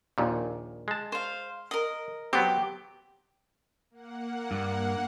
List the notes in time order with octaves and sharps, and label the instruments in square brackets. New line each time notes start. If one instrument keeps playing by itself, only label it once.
[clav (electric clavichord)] A#1 D#2 A#2
G#3 A5
[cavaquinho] C5 F5
A#4 D#5
[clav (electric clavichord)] F#3 B3 C4 [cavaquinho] G4
[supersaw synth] A#3 F#5
[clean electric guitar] G2